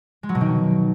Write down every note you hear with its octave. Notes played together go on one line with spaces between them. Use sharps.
G#3
F#3
B2
D#3